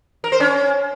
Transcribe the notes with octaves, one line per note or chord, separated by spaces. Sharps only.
A#4
C5
C#4